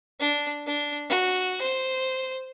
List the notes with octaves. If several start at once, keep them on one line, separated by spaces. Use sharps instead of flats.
D4
D4
F#4
C5